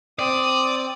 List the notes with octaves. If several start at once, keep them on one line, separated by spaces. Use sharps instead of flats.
C4 D5 D#6